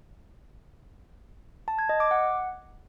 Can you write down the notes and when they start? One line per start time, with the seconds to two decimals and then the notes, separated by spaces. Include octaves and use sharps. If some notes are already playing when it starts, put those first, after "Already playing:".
1.68 A5
1.79 G#6
1.89 D#5
2.00 D6
2.11 F#5